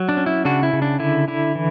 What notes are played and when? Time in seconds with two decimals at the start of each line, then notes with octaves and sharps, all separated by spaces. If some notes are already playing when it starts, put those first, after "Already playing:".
Already playing: F#3
0.09 D4
0.17 C#4
0.26 E4
0.45 C#3 D4 F#4
0.63 E4
0.73 C#3
0.82 D4
1.00 D3 E4
1.28 D3 E4
1.55 E3